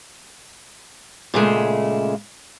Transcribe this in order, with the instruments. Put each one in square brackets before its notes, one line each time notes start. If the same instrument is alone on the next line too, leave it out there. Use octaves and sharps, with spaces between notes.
[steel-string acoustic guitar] A#2 C#3 G#3 A3